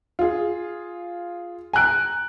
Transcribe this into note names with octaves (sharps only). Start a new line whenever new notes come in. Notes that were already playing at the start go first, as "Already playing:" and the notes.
F4 G#4
G#5 A#5 F#6 D7